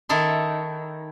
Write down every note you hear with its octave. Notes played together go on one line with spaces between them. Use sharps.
D#3 D#4 E4 A4 C6